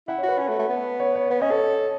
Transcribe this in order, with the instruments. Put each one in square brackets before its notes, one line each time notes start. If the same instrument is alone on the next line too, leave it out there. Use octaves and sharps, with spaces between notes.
[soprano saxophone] E4 [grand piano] F#5
[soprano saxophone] F#4 [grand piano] C#5
[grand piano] B4
[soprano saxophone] C#4
A3
A3
B3
[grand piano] C#5
C#5
[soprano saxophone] B3 [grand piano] C#5
[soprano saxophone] C#4 [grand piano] D#5
[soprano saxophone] A4 [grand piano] C#5